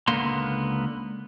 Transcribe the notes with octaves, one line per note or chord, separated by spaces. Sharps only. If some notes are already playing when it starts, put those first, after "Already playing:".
C#2 D3 A#3 B3 C6